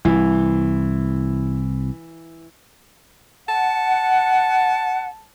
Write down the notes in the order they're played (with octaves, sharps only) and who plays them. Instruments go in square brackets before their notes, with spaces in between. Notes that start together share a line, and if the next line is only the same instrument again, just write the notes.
[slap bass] C2 [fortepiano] E3
[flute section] F#5 [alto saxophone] A5